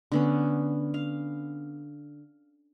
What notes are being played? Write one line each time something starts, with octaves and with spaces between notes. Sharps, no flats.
D3 B3 C#4
F5